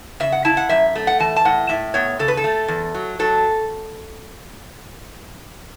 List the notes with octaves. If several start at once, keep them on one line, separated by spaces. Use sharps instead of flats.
C#3 E5
F#5
E4 A5
F#5
F#2 E5
A3
F#5
E3 A5
A5
A2 F#5
A2 E5
B3 C#5
C#3 A4
B4
A4
A3
E2
F#3
F#3 A4